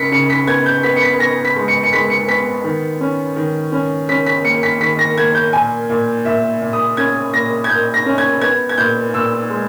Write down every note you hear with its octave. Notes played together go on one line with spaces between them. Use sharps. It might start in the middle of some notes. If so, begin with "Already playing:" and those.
Already playing: C#3 B6 C#7
C#3 C#7
B6
B3 G#6
G6
B3 B6
C#7
B6
B3 A#6
B6
G#3
C#7
C#7
G#3 B6
C#7
B3 B6
D#3
C#4
D#3
C#4
C#4 B6
B6
A#3 C#7
B6
D#3 B6
A#6
A#3 G#6
G6
A#2 G#5
A#2
A#2 E5
A#2
D#6
C#4 G#6
A#2 A#6
G#6
A#2 G6
A#6
C#4
G#6
B3 G#6
G#6
A#2 G6
A#2 E6
G#3